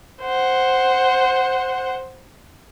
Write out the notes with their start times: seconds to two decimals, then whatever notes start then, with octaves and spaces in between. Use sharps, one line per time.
0.22 C5 F#5